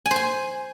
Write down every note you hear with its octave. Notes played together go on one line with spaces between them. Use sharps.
G#5
C5
G#5